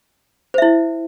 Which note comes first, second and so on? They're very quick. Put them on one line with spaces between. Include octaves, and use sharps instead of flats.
C5 E5 E4